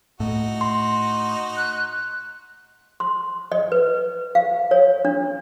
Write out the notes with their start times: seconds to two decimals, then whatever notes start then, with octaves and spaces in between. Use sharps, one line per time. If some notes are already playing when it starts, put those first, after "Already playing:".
0.20 A2 D#4 F#4
0.61 C6
1.57 F#6
3.00 C6
3.52 D#5
3.72 B4
4.35 F5
4.71 C#5
5.05 D4